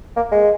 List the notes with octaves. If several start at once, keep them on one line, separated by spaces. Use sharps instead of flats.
A#3
G#3